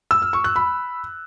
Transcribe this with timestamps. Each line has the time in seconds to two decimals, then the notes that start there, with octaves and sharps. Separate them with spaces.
0.11 E6
0.22 F6
0.33 C#6
0.44 F#6
0.56 B5